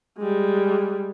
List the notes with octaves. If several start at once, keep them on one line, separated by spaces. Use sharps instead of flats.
G3 G#3